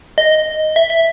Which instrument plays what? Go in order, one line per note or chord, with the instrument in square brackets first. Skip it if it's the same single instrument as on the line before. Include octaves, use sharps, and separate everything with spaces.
[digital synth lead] D#5
E5
E5